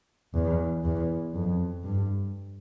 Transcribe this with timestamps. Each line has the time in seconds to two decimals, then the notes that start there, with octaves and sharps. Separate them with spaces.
0.34 E2
0.84 E2
1.34 F2
1.84 G2